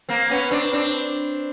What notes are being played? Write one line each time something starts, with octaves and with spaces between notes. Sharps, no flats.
A#3 C4
B3 C#4
C4 D4
C4 D4